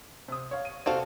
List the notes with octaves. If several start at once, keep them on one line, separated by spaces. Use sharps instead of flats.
C3 D#6
C#5 F5
D#7
C3 C4 F#4 G4 A4 F5